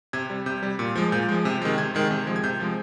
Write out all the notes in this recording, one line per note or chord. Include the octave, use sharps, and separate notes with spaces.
C3 G#6
G3
C3 G6
G3
A#2
F3 G#3
A#2 G6
F3 G#3
C3
D#3 G#3
C3 G#6
D#3 G#3
C3
F3 G#3
G#6
C3 G6
F3 G#3